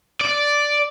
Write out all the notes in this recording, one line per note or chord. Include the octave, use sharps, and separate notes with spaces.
D5